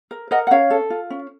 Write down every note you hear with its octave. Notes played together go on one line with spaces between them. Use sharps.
A#4
A#4 D#5 F#5
F#5
C#4 C#5 F5
A4
F4
C#4